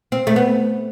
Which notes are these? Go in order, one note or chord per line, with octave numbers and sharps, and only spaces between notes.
C4
A3
B3